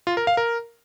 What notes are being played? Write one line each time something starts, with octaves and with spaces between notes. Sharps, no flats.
F4
A#4
F5
A#4